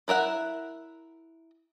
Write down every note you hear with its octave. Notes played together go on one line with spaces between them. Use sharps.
E4 A#4 E5 F#5